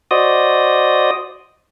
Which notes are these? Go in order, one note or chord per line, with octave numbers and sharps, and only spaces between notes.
F#4 C5 D5 D#5 D#6